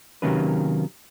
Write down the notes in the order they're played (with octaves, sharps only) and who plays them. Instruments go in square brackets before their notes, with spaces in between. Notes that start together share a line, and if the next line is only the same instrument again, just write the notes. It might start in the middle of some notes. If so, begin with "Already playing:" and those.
[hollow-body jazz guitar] C3 D#3 F#3 A#3 C#4 B4